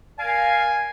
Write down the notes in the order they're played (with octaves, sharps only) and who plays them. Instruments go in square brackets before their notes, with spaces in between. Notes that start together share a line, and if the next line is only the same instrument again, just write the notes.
[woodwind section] A#4 D5 F5 [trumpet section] G#5